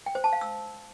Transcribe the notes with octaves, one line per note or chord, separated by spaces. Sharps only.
G5
C5
A5
F5
E6